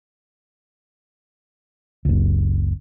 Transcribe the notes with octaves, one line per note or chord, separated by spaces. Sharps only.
F#1 C#2